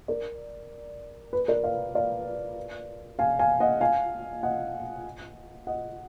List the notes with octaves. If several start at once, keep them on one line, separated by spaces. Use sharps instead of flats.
A#4 D5
B4
A#4 D5
D5 F5
D5 F5
F5 G#5
F5 G#5
D#5 F#5
F5 G#5
D#5 F#5
D#5 F#5